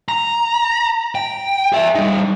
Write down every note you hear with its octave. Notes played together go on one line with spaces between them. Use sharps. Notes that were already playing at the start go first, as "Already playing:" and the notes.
A#5
G5
G#4 E5
G3 D#4